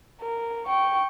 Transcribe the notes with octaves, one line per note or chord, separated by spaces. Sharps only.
A#4
G5 C#6